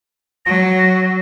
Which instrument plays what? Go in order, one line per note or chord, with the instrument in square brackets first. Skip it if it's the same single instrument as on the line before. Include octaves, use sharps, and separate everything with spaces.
[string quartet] F#3 [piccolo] A#6